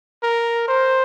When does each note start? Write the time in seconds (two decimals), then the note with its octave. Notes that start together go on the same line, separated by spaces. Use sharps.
0.23 A#4
0.68 C5